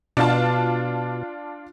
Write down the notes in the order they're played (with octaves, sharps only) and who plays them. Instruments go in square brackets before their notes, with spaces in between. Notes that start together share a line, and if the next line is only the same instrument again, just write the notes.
[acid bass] B2 [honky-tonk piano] D4 F4 A5